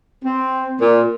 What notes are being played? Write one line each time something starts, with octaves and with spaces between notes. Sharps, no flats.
C4
A#2